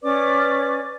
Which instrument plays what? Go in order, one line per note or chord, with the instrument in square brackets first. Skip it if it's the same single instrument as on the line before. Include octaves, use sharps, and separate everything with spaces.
[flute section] C#4 B4 D5 D6